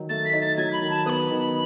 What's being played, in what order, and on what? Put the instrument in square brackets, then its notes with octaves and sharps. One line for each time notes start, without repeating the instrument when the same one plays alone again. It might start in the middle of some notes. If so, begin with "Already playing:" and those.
Already playing: [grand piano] D#3 F#3
[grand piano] A3 [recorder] A6
[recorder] B6
[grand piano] D#4
[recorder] A6
[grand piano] F#3 [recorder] G#6
[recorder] B5
[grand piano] D#3
[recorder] A5
[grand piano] B3 [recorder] D#6
[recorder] B5
[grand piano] D#3